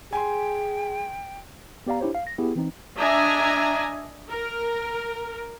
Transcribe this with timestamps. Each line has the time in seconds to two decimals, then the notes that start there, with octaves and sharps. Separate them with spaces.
0.13 G#4 G5 G#5 C6
1.87 B3 G4 D5 F5 A#5
2.00 D4 E4 G4 C5 C#5
2.15 F5
2.27 A#6
2.38 B3 E4 G4 G#4
2.56 E3 C4 D#4
2.98 D4 D#5 E5 G#5 A#5
4.29 A#4